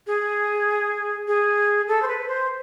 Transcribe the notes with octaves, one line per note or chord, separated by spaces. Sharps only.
G#4
G#4
A4
C5
B4
C5